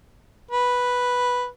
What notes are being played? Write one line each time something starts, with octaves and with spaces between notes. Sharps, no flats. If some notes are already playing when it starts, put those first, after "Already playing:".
B4